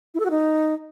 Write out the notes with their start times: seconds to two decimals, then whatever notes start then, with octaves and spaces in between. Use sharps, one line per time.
0.14 E4
0.20 A4
0.25 F#4
0.30 D#4